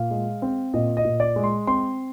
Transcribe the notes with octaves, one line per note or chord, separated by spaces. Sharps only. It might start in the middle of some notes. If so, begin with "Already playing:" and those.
Already playing: A#2 F5
G#3
C4
A#2 D#5
D#5
A#2
D5
G#3
C6
C4 C6